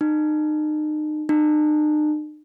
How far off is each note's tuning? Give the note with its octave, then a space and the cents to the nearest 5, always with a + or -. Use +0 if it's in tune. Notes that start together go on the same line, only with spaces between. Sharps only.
D#4 -35
D#4 -45